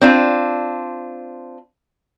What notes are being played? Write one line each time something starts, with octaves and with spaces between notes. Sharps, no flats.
C4 D4 F4